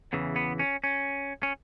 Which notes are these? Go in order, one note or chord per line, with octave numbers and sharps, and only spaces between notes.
E2 C#3 E3
B3
C#4
C#4
C#4